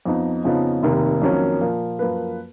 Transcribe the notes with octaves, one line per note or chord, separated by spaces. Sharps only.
F2 F3 B3 D#4
F2 C#3 F3 B3 D#4
F1 D#2 D#3
F2 D#3 F#3 A#3 C#4
A#2 F3 A#3
F#2 F3 A#3 F4 B4